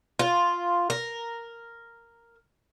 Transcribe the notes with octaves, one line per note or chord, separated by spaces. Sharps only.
F4
A#4